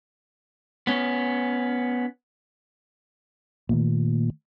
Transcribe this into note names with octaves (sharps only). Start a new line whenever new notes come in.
B3 C#4
A#2 D#3 A3 A#3